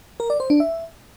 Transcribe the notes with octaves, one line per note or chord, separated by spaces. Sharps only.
A#4
D5
C5
D4
E5